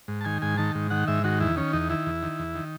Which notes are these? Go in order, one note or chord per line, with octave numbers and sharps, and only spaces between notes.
G#2
A5
D#3 G#5
G#2 G#5
D#3 A5
G#2
D#3 F#5
G#2 E5
D#3 F#4
E2 E4
D#3 C#4
E2 D#4
D#3 E4
E2
D#3
E2
D#3